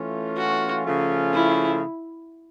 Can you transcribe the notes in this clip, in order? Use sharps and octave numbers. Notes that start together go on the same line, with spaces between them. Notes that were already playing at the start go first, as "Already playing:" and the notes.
Already playing: E3 A3 C#4 F4
F#4
C#3 F3 A3 C#4 F4
E4